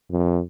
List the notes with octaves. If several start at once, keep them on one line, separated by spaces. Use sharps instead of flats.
F2